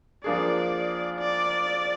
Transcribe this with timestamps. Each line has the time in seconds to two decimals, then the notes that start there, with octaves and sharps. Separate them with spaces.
0.24 F3 A#3 D4 G#4 D5
1.19 D5